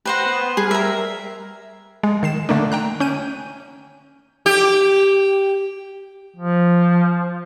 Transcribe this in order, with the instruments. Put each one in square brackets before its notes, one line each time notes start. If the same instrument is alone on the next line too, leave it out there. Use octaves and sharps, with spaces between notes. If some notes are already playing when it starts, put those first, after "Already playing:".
[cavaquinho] B4 C5 F#5 [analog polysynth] G5 G6 A#6
[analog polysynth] B3
[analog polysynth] G3 A#4 [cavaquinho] G#4
[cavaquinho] E5 A#5
[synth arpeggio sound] G#3
D#3 C7 E7
D3 A3 A#3 D4
G5 A#5 F#6
C#4 G6 D#7
[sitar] G4
[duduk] F3